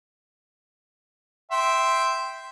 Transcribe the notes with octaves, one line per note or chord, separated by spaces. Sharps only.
E5 G5 C6